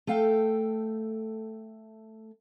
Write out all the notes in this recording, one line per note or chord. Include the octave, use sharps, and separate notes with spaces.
A3 A4 F5 G5